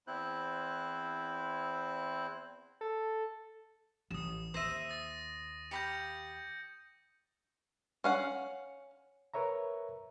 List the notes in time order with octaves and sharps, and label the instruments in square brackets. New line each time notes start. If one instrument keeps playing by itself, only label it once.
[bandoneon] E2 C4 E4 C5 F#6
[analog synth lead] A4
[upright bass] A1 [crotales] D#6 E7
[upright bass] D#2 [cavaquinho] C5 E5 [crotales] D#6 A#6 D#7
[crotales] D#6 A6
[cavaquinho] G4 F5 B5 [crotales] G6 A#6 C#7
[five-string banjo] C#4 F5 F#5
[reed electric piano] A#4 B4 C#5 E5 A#5